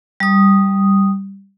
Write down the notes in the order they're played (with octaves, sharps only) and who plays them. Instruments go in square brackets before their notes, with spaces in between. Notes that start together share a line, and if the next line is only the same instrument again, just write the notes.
[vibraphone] G3 D#6